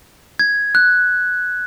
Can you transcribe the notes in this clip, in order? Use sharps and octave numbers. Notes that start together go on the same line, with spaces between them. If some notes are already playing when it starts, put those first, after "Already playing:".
G#6
F#6